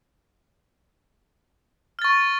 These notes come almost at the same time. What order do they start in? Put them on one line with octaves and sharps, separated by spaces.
F6 A6 C#6